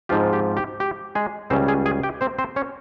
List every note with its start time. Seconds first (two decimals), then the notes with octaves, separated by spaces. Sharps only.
0.09 G#2 F3 C4 F4 G4
0.33 G4
0.57 G4
0.80 G4
1.15 G#3 G#4
1.50 C#2 C#3 G3 C4 C#4 C5
1.68 G#4 G#5
1.86 G#4 G#5
2.03 G4 G5
2.21 C4 C5
2.38 C4 C5
2.56 C#4 C#5